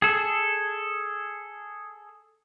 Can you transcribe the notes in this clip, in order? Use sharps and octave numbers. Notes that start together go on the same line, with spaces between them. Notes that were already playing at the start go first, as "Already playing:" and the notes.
G#4 A4